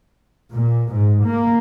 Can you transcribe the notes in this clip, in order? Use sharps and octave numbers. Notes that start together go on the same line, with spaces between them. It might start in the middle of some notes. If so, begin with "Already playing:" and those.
A#2
G#2
A#3